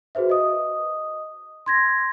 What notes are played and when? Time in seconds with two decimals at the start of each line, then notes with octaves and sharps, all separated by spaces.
0.15 F#4 G#4 B4 C5 E5
0.30 D#5 D#6
1.66 C6 G#6 A#6